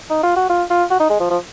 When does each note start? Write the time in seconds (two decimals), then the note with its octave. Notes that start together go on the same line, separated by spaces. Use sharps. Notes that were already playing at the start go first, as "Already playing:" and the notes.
0.10 D#4
0.23 F4
0.36 F#4
0.49 F4
0.70 F4
0.90 F#4
1.00 D#4
1.10 G#3
1.20 F3
1.30 F3